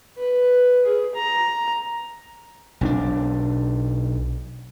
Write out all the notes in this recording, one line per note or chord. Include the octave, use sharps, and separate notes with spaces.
B4
G#4
A#5
B1 C#4 D4